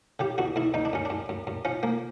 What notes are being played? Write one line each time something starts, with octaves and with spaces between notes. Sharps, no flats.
C#3 G4
E2 F#4
E2 E4
E2 D#4
D4
F#2 C#4
F#2 D4
F#2
F#2
F3 C#4
F3 A#3